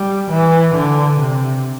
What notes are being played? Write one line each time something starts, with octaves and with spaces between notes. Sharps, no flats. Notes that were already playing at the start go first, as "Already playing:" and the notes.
Already playing: G3
E3
D3
C3